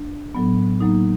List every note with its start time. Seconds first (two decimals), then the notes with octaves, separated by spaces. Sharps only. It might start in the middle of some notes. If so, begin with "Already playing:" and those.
Already playing: D4
0.35 A2 F#3 B3
0.80 A2 F#3 A#3 D#4